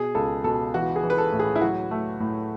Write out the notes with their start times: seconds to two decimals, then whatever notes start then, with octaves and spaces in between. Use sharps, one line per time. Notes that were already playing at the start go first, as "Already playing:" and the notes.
Already playing: B2 G#4
0.15 C#2 A4
0.44 B2 A4
0.74 E3 F#4
0.96 G#4
1.03 E3
1.10 B4
1.18 A4
1.32 A2
1.40 G#4
1.56 E4
1.61 F#3 F#4
1.91 A3
2.20 A2